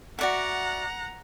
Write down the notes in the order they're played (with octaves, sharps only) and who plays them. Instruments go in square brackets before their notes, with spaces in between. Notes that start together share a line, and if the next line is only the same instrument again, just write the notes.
[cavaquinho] F#4 D5 E5 [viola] F#5 A#5